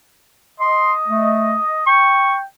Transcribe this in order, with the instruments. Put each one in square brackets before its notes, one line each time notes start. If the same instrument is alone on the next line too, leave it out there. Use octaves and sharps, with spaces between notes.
[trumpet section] D#5 [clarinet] C6
[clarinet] A3
[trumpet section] G5 [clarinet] C#6